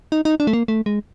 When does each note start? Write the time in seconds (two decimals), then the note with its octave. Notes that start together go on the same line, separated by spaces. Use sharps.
0.12 D#4
0.25 D#4
0.40 D4
0.47 A3
0.53 A#3
0.68 A3
0.86 G#3